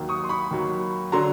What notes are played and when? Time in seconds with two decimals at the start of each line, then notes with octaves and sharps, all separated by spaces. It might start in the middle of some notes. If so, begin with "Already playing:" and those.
Already playing: D#2 D#3 F#3
0.09 C#6 D#6
0.24 C6
0.29 B5 C#6
0.51 D#2 D#3 F#3
1.12 D3 F#3 A#5 C6